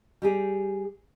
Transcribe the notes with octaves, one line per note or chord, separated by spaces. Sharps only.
G3 G4 G#4